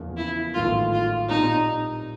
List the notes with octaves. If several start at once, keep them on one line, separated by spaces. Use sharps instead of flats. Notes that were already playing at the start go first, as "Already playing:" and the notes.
Already playing: E2 C#3 F3 A#3
E4
A1 G#2 D#3 F#3 A3 F4
F4
A#2 G3 C4 D#4